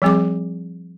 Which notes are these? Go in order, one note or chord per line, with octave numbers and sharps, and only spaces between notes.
F3 G3 C4 G#4 D6